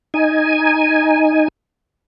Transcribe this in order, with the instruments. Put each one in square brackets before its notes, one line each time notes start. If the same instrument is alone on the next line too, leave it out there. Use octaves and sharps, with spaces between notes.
[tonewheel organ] D#4 G#5